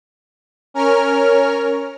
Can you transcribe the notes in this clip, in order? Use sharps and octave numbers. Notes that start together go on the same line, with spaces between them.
C#4 A#4 C#5 F6